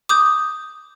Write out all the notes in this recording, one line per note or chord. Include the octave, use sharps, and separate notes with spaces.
D6 D#6 G6